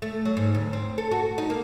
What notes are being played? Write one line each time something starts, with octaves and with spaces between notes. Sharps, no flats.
A3
F#3
G#2
D2
C4
A4
F#4
D#4
A#3